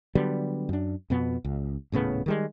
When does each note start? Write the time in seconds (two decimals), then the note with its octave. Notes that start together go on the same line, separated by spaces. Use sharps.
0.15 D3 F#3 G3 B3
0.69 F#2 D4
1.10 F2 B2 B3
1.44 C#2
1.92 D#1 A2 C#3 B3
2.26 D#3 G3 G#3